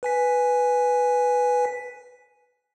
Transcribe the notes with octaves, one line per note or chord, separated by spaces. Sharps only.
B4 G#5 B6